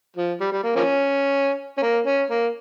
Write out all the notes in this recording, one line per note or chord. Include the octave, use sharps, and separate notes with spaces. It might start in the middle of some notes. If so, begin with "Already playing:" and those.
F3
G3
G3
A#3
F3 A#3 C#4
C#4
A#3
C#4
A#3